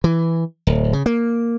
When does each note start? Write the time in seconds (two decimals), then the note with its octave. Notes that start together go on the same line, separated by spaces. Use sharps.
0.04 E3
0.67 D1
0.93 C#3
1.06 A#3